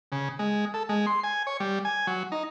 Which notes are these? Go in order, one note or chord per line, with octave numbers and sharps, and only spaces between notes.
C#3
G#3
A4
G#3
C6
G#5
C#5
G3
G#5
F#3
D#4